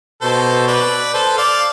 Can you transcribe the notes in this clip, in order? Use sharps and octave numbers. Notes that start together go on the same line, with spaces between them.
B2 A4 C5
B4 D5
A4 C5
D5 F5